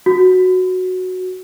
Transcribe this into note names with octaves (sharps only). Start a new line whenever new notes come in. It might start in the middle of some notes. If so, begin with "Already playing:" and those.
F#4